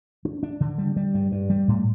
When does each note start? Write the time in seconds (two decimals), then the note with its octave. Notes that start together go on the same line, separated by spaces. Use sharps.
0.25 D4
0.43 D4
0.61 D3
0.78 G3
0.96 G3
1.14 G2
1.32 G2
1.50 G3
1.68 A2